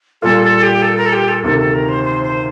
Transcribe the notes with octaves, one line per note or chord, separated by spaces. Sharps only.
A#2 G3 A#3 F4 A4
A4
G4
A4
A#4
A4
G4
A4
D2 C3 D#3 A#3 A4
A4
A#4
C5
C5
C5